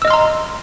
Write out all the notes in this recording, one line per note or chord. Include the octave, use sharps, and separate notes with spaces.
D#5 A#5 C6 E6 F6